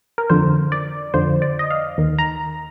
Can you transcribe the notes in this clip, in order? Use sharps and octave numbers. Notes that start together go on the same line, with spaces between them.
A#4
F2 D3 F3 C5
D5
F2 D3 F3 C5
D5
D#5
F5
D#2 D#3
A#5